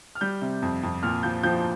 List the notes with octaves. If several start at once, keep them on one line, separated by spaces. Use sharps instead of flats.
F6
G3 G6
C3
F2
F2
A#2 F6
F3 G6
F3 G6